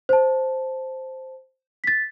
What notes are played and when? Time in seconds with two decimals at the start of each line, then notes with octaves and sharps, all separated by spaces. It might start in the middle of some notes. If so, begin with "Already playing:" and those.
0.09 C5 A5
1.84 A6 B6